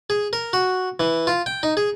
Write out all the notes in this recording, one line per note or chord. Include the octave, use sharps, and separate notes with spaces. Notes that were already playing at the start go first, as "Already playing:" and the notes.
G#4
A#4
F#4
E3
F4
G5
D#4
G#4